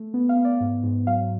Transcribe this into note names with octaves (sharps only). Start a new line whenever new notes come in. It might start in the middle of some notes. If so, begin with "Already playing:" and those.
Already playing: A3
B3
F5
B3
D5
G#2
G#2
F#3 F5